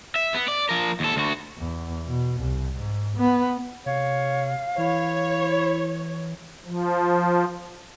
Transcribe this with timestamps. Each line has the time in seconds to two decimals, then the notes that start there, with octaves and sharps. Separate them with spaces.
0.16 E5
0.34 B3
0.48 D5
0.69 F3 A#4
1.00 D#2 A4
1.16 D2 F#4
1.58 E2
2.07 B2
2.41 C2
2.77 G#2
3.17 B3
3.86 C3 C#5 F5
4.78 E3 E4 C#5
6.65 F3